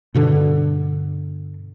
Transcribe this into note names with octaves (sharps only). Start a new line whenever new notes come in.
G2 B2 D3 D4